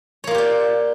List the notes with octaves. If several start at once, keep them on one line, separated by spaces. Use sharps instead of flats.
A#3 F4 G4 C#5 D5